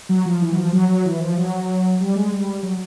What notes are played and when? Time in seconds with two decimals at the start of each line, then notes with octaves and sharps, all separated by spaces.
0.09 F#3
0.25 F3
0.41 E3
0.52 F#3
0.57 F3
0.73 F#3
0.89 F#3
1.05 E3
1.20 F3
1.37 F#3
2.00 G3
2.15 G#3
2.32 G3
2.63 F#3